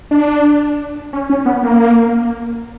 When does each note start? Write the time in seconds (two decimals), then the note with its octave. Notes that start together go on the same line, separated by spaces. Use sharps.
0.11 D4
1.13 C#4
1.30 C#4
1.46 B3
1.63 A#3